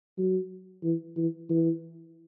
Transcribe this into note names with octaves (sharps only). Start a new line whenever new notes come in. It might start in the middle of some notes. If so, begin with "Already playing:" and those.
F#3
E3
E3
E3